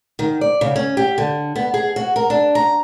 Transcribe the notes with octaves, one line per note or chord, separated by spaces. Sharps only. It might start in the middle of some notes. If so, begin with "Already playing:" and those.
D#3
D5
C#3
C#4
G4
D3
B3
G#4
F#4
A#4
D4
A#5